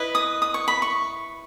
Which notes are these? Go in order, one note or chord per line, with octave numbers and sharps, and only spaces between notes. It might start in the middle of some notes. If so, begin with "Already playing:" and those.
Already playing: E4 B4 D#5
D#6
D#6
C#6
B5
C#6